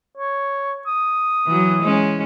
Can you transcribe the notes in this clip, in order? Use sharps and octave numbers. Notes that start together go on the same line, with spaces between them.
C#5
D#6
E3 F#3
G#3 C#4